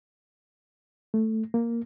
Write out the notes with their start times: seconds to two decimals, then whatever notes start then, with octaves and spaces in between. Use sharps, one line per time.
1.14 A3
1.54 A#3